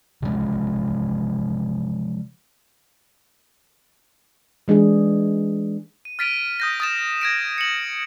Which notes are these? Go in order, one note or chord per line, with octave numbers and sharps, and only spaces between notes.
C3 F3 G#3 C#4
E3 G#3 D4 G#4
D#7
F6 A6 B6 D7 D#7 F7
D#6 G6 A#6
D#6 A6 E7
G#6 A#6 D7
C#7 F#7